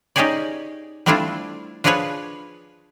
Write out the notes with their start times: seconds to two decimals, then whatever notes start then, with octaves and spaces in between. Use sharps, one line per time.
0.16 C#4 D#4 G4 G#4 C#5 D5
1.06 G3 A3 C4 D4 E4 F4
1.84 F3 D4 F4 G#4 B4 C#5